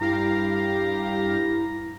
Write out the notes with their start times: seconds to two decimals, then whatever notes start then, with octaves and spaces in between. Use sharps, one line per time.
0.01 G2 E4 G4 F5 A#5